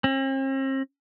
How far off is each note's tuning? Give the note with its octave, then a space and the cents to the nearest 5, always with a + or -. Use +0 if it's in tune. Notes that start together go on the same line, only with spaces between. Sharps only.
C4 +45